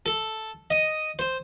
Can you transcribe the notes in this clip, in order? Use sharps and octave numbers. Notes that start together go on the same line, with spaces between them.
A4
D#5
C5